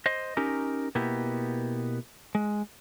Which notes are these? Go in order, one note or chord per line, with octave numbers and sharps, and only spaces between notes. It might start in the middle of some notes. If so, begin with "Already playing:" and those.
C5 D#5
C#4 D#4 G4 A#4
B2 A#3 B3 E4 G4
G#3